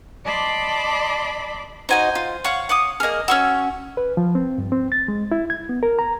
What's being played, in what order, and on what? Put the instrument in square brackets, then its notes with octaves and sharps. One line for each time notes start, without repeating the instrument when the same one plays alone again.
[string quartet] D5 D#5 A5 B5 C6 D6
[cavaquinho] D#4 F#4 D#5 [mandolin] C5 G#5
[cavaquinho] F4
[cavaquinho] C#5 F5 [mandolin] F#5
[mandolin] F#5 D6 D#6
[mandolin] A#3 F6 [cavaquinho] G#4 D#5
[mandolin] C#4 C#6 E6 [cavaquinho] F#4
[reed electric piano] B4
F3
C4
G2
C4
A6
G#3
E4
G#6
B3
A#4
A#5